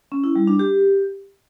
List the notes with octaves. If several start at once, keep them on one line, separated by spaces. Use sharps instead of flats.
C#4
E4
G3
D4
G4